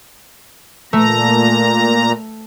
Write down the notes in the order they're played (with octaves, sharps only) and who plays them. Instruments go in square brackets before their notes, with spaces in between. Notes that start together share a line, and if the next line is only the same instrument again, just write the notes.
[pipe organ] A#2 A#5 [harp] A3